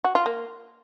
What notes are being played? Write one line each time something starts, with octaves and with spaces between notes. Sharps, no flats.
F#4
F4
A#3